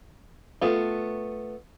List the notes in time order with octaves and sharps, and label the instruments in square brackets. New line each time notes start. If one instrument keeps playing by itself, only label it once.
[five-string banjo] A3 B3 F4